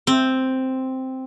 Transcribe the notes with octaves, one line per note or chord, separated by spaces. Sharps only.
C4